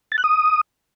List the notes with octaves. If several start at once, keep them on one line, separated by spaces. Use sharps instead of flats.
A6
F#6
D#6